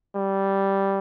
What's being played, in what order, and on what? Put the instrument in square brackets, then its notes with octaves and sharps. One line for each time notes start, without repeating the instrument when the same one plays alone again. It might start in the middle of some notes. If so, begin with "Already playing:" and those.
[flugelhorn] G3